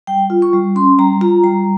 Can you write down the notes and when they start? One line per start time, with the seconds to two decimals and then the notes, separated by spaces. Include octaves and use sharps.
0.07 G3 G5
0.30 F4
0.42 C#6
0.53 G3
0.76 C#4 C6
0.99 G3 A#5
1.21 F4 A#5
1.44 G3 A#5